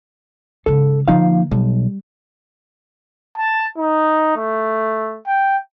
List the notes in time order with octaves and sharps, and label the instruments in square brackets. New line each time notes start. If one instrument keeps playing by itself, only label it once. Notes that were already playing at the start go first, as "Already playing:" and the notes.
[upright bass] G#2 C#3 [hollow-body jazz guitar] A4
[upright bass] D3 A#3 [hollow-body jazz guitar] F3 D#4 F5
[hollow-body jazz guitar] B1 [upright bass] G3
[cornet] A5
D#4
A3
G5